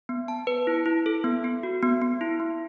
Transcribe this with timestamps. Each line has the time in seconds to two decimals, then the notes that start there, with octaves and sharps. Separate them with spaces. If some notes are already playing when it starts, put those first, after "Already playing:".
0.09 B3
0.28 A5
0.47 B4
0.67 E4
0.86 E4
1.06 A4
1.24 B3
1.44 B3
1.63 F#4
1.83 B3
2.02 B3
2.21 E4
2.40 B3